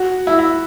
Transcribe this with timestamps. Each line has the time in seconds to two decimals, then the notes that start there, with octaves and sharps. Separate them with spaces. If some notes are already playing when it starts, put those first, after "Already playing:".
Already playing: F#4
0.27 E4
0.39 E4